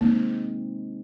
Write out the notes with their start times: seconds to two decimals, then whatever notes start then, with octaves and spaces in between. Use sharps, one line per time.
0.01 G#3 A#3 C4 D#4